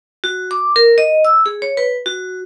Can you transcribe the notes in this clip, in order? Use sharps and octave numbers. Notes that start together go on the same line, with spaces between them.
F#4
D6
A#4
D#5
E6
G#4
C#5
B4
F#4